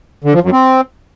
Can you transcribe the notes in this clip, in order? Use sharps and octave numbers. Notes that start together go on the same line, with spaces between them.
D3
F3
F#2
C4